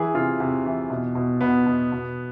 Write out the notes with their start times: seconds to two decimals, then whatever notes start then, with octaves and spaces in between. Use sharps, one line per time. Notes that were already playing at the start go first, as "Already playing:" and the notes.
Already playing: E3 G#4
0.14 C3 F4
0.40 C3
0.66 E3
0.90 B2
1.15 B2
1.41 B2 B3
1.66 B2
1.92 B2